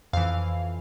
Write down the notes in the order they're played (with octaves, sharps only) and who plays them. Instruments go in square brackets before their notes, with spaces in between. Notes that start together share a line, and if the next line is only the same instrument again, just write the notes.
[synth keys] F2 E3 F5